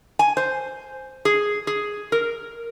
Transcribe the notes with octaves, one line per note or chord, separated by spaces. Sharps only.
G#5
C5
G#4
G#4
A#4